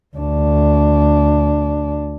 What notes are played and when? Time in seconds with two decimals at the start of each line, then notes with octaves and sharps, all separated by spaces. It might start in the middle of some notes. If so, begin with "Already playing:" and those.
0.16 D2 D4